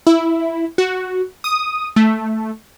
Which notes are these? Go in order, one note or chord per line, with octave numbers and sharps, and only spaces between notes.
E4
F#4
D#6
A3